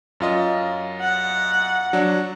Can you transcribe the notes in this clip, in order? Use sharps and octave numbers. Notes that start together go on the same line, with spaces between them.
F#2 F4 D#5
F#5
F#3 D4